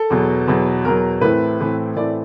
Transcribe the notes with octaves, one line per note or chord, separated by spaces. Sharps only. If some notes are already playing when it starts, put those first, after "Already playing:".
Already playing: A4
E2 B2 F#3
E2 B2 F#3
E2 B2 F#3 A#4
A2 E3 A3 C4 B4
A2 E3 A3 C4
A2 E3 A3 C4 D5